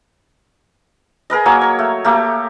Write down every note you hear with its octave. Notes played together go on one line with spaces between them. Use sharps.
G#4 A#4 B4 D#5
F#3 A#3 C#5 G#5
C#5
A3
A3 A#3 G4